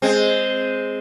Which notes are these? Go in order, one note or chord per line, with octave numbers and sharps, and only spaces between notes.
G#3 C4